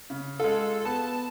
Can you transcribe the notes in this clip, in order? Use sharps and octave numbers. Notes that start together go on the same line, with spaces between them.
C#3
G#3 F4 A4
B3 A5